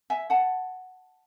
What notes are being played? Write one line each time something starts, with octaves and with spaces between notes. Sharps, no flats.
E5 G#5
F#5 A5